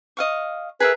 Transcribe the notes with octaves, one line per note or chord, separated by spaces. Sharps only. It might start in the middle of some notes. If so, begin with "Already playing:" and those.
D#5 F5 C#6
G#4 A#4 B4 E5